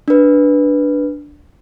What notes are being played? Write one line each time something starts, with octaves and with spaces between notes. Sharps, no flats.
D4 B4